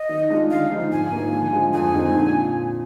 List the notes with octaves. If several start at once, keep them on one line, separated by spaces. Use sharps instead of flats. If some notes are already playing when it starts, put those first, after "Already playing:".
Already playing: D#5
D#3
G#3 D4 F4
D3 F5
F3 G#3 D#4
G#2 G#5
F3 A#3
D3
F3 G#3
F2 G#5
D3 G#3 C4 D#4
A#2